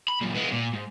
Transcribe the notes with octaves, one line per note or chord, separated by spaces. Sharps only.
B5
F#2 A#2
G#3 B3
A#2
G#2